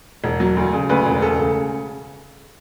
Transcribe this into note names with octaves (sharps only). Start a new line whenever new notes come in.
E1
F#3
D2
C#3
D2 B4
E1
C#3 A4
C#3